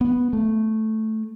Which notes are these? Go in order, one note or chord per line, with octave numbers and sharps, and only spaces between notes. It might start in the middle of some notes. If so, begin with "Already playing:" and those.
B3
A3